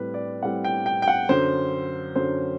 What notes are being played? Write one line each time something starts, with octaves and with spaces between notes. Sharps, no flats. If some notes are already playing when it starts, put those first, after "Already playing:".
Already playing: A2 G3 C4 B4
D5
A2 G3 C4 F#5
G5
G5
G5
F#5
F#2 D3 F#3 C5
F#2 D3 F#3 C5